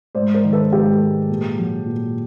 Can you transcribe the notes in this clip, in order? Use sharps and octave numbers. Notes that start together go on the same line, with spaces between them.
G#2 C5 D5
A#4 C5
D#3
A4 B4
G#2 G4 A4
G#3
A#2
F#3
A#2